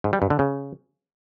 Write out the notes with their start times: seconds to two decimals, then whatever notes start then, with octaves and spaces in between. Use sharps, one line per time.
0.04 G#2
0.13 G3
0.22 G2
0.30 D3
0.39 C#3